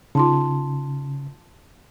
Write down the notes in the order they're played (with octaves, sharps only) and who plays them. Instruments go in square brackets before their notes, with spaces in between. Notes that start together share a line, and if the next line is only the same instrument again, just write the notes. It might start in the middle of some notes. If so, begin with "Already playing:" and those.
[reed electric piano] C#3 [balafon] D#4 F4 [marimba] A5 C6